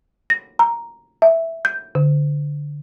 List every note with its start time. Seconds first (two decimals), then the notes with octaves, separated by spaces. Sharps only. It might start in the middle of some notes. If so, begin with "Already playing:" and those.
0.30 A#6
0.59 A#5
1.22 E5
1.65 G6
1.95 D3